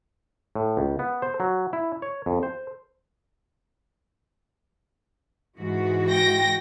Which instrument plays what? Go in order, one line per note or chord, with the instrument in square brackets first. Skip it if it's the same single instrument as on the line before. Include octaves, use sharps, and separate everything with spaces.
[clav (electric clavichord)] A2
C#2
B3
C5
F#3
E4
C#5
F2
C5
[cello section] G#2 E3 F#4
[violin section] G5 A#6